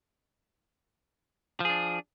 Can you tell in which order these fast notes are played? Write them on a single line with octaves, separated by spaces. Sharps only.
F3 G#4 D4